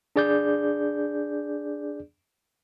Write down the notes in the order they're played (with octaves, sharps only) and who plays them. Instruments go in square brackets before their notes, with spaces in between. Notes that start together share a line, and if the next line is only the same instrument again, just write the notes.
[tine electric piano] D4 G#4 D5 D6 G6